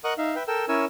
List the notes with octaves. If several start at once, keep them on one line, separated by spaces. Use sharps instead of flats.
A#4 D#5 F#5 C#6 D#6 F#6
D#4 E5 F5
B4 E5 G5
A4 A#4 G5 E6
C#4 E4 A#4 C#5 G#5 E6